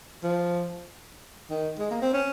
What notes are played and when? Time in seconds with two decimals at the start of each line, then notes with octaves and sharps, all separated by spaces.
0.23 F3
1.50 D#3
1.79 G#3
1.91 A#3
2.02 C4
2.13 C#4